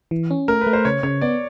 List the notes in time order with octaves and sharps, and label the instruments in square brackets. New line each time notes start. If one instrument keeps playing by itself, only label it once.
[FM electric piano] E3
C#4
[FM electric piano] A3 [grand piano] A#4
[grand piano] B4
[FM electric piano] A3
[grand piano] C5
[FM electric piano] C#3 [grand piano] C#5
[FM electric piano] C#3 [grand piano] C#5
[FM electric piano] B3 [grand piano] D5